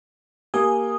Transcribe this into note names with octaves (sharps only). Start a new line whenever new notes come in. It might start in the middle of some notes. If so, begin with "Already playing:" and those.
A#3 G4 G#5 D#6